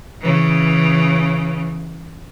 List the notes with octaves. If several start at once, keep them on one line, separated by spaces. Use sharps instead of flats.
C#3 E3